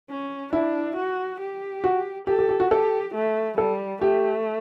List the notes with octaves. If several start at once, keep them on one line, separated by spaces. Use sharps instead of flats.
C#4
D4 E4
F#4
G4
F#4
G4 A4
G4
G4
F#4
G4 A4
A3
G3 A4
A3 G4